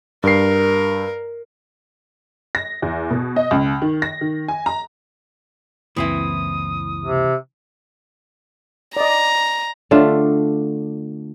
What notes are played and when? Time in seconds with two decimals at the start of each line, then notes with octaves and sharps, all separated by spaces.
0.24 G2 A#4 C7
2.55 A#6
2.82 E2
3.11 B2
3.36 D#5
3.51 C#2
3.82 D#3
4.02 A#6
4.21 D#3
4.48 G#5
4.66 A#5
5.96 C#2 F#2 E3 A#3 C4 E4 D#6
7.04 C3
8.97 D5 D#5 A#5
9.91 D3 A3 D4 F4